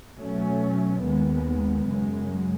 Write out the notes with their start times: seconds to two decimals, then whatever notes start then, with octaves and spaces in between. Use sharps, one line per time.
0.16 B2 F#3 A3 C#4
1.03 D#2 D#3 G#3 B3
1.88 F#2 C#3 G#3